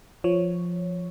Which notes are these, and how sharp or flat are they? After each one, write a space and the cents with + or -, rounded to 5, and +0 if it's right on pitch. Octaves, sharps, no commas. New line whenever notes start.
F3 +0 C#5 +0